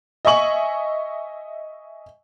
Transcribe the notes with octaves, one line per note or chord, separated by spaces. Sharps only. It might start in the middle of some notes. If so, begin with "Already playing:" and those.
D#5 E5 G#5 C#6 F#7